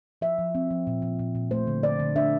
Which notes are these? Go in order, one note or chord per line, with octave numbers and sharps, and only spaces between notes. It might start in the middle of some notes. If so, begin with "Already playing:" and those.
F3 E5
F3
C4
F3
A#2
F3
A#2
A#2
A3 C5
D3
D3 D5
D3
D4 E5